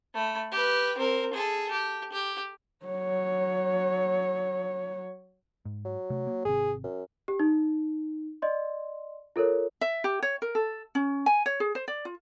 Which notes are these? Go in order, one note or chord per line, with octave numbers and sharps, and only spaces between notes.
A3 B5
G4 B4
C4 A#4
G#4 A4
G4
G4
F#3 C#5
G#2
F#3
C3 A3
A#3
G#1 C3 G#4
F#2
G4
D#4
D5 D#5 C6
F4 A4 A#4 C#5
E5
G4
C#5
A#4
A4
C#4
G#5
C#5
G#4
C5
D5
F4